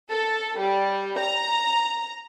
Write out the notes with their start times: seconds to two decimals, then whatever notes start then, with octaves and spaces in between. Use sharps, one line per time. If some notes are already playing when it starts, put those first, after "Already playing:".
0.11 A4
0.60 G3
1.19 A#5